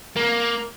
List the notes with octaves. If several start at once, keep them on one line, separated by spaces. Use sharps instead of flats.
A#3